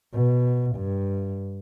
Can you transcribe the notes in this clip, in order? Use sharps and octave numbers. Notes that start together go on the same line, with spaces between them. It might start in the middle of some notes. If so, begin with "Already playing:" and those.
B2
G2